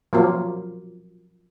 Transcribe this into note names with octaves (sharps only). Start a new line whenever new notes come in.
F3 F#3 A#3